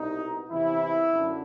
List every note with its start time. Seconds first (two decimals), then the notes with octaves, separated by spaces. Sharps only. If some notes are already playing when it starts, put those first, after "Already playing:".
Already playing: C2 B2 D#4
0.50 E2 C3 E3 E4
1.12 F#2 D3